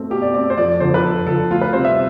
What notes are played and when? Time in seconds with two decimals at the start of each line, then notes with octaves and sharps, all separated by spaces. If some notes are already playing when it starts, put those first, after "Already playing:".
Already playing: B2 A3 C4
0.10 B2 G4
0.22 D5
0.34 A3 C4 D5
0.50 C5
0.58 F2 D5
0.80 D3 F3 C5
0.94 B4
1.04 F2 A4
1.27 D3 F3 A4
1.50 D2 F4
1.61 B4
1.73 C3 G3 C4 C5
1.85 E5